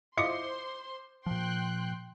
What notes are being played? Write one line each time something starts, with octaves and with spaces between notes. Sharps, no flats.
E4 F4 C5 D#5 C6 D6 C#7
A#2 F3 G5 C6 F#6